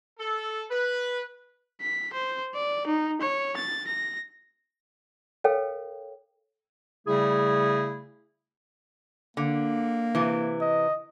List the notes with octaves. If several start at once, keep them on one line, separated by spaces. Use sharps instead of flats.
A4
B4
B6
C5
D5
D#4
C#5
A6
A#6
A4 A#4 C#5 F5 G5
C#3 G3 A3 E4 G#4
D3 A#3
C3 E3
D#5